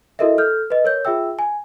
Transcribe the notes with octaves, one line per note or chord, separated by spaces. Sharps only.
E4 F#4 A4 A#4 D#5 E5
A4 F6 G6
B4 D#5
A#4 C#5 G6
F4 G#4 E5 G5 E6
G#5